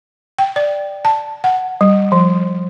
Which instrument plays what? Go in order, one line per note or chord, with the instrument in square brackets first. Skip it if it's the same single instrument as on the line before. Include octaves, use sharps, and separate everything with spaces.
[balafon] G5
D5
A5
F#5
G3
F3